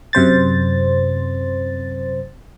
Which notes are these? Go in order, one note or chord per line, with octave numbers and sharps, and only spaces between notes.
F#2 C3 C5 A6